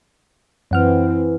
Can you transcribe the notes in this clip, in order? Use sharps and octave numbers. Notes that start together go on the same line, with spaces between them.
F#2 E3 C4 F#5 F6